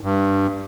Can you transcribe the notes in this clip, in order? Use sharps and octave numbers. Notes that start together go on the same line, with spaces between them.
G2